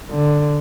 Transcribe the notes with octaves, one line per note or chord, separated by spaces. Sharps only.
D3